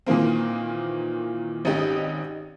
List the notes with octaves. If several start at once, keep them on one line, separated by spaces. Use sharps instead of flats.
A#2 D#3 E3 A#3 C4
G#1 C#4 D#4 G4